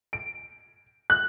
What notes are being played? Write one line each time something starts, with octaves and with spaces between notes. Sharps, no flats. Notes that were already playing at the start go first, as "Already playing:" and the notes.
D7
F#6